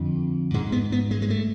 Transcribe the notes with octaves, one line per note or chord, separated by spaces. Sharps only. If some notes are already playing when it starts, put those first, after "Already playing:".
Already playing: F2 D3
G#2 G#3
B3
B3
G#3
G#3
A3